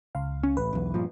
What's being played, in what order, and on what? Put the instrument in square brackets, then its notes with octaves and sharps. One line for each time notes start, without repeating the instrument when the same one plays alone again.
[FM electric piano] C#2 F5
[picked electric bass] C#4
[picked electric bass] A1 [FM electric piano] B4
[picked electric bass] B1 E2
G2 A#2 F3